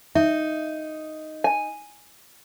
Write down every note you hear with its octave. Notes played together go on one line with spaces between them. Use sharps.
D#4 E5
G#5